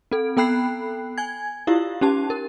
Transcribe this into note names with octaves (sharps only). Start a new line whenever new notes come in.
C4 A4
B3 A4 G5 B5 F#6 C7
G#5 G#6
E4 F4 G4 F5
C#4 D#4 G4 A5
A#4